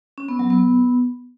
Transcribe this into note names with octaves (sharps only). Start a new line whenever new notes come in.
C#4
B3
F#3
B3